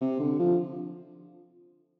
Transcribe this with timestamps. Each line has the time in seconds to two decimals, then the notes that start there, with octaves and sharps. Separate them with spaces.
0.01 C3
0.19 D3
0.39 F3